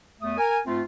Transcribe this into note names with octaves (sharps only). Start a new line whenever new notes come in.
E2 A3 D#6
A#4 G#5
G#2 A3 C4 F4